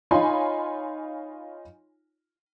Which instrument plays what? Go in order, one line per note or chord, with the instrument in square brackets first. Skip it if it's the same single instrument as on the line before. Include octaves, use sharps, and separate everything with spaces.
[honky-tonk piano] D#4 F4 C#5 G#5 B5 C6